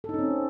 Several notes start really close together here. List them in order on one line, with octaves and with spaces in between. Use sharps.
A4 D#4 C#4 C4